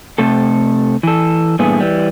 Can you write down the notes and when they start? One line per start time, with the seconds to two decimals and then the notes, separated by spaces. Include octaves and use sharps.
0.18 C3 A3 A4
1.03 E3 A4
1.59 G2 A#2 E3 A3 B3 G#4
1.80 E3 G3